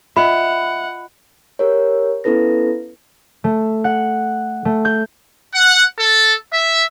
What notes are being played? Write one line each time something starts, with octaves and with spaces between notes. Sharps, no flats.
F4 D#5 E5 F#5 B5
G4 A#4 C#5
B3 C#4 E4 A4 B4 A#6
A3
F#5
A3
G6
F#5
A4
E5